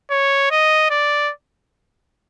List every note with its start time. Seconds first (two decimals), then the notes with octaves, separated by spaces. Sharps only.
0.10 C#5
0.51 D#5
0.90 D5